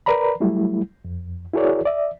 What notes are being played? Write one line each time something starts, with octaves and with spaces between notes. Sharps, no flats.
A#4 B4 D5 A#5 B5
F#3 G3 A3 E4
F2
E4 F#4 G#4 A#4 C#5 D5
D5 E5